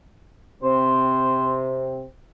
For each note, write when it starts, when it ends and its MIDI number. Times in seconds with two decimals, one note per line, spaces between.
0.63 2.06 48
0.63 2.06 60
0.63 1.66 72